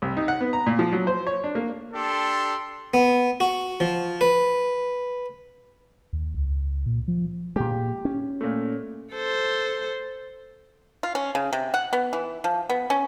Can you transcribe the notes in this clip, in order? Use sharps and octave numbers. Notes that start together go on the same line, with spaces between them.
C2
D#4
F#5
B3
A#5
A#2
F3
F#3
C5
C#5
D4
A#3
D4 G4 A4 C6
B3
F#4
F3
B4
D#2
C#2
A#2
F3
A#2 G#3 G4
C#4
A#2 A3
A4 C5
F4
C#4
C#3
C3
F#5
B3
E3
F3
B3
C#4